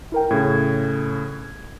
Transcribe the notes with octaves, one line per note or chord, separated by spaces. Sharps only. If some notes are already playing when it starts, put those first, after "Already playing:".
E4 A#4 G5
A2 C#3 G#6